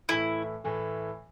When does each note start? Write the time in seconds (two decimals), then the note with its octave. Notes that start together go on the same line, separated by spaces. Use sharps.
0.09 A2 E3 A3 E4
0.64 A2 E3 A3